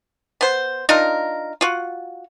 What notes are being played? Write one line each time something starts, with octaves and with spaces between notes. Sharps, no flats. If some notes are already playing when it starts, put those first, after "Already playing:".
B3 C5
D4 D#4 F4 A#4
F4 F#4